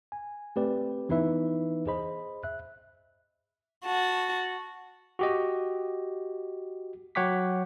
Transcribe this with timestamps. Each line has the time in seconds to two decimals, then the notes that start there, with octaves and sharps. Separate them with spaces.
0.12 G#5
0.56 A3 C4 G4 B4 D5 G5
1.09 E3 B3 D#4 E4 B4 E5
1.87 G#4 C5 D#5 B5
2.44 E5 F#6
3.85 F#4 A5
5.19 F#4 G4 D#5
7.15 F#3 C#5 F#5 G5 D6 B6